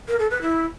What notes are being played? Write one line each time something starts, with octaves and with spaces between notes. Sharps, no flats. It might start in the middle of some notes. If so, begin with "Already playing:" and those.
A#4
A4
B4
E4